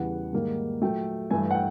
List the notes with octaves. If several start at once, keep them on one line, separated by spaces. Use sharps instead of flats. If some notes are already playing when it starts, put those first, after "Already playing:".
Already playing: E2 C#3 E3 G3 F#5
G#2 D#3 G3 A#3
A#2 F#3 A3 G5
G2 E3 A3 G#5
F#5
G5